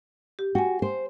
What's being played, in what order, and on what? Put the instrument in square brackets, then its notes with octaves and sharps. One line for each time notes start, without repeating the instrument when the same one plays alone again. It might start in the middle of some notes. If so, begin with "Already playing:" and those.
[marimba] G4
[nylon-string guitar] F#4 [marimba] G5 G#5
[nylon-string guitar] C5